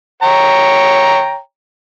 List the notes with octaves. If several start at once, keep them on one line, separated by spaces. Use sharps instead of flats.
C#5 G5 A#5